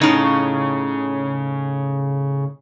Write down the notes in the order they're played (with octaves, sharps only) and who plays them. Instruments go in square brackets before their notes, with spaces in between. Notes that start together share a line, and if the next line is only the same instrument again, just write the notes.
[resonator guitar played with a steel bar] A2 D#4 [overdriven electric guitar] C#3